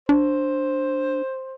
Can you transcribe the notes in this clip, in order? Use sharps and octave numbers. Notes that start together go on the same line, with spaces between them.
D4 C5